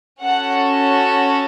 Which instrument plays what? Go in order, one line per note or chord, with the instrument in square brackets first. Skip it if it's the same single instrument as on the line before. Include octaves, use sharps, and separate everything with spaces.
[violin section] C#4 F#4 A4 F#5